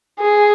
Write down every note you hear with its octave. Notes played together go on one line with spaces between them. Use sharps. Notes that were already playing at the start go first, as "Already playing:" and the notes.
G#4